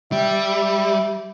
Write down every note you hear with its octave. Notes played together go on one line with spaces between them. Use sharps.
G3 E5